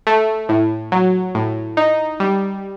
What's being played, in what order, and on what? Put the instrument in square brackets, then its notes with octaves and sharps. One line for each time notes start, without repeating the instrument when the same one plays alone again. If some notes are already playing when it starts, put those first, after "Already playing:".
[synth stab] A3
A2
F#3
A2
D#4
G3